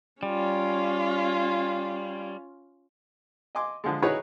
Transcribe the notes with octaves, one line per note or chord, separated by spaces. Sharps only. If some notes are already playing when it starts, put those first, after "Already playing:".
G3 C#4 F4
D#5 G#5 C6 D6
D3 F3 G#3
D#4 E4 F#4 G#4 B4 C#5